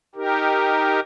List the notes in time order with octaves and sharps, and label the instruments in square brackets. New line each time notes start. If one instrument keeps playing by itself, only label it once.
[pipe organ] D#4 G4 A#4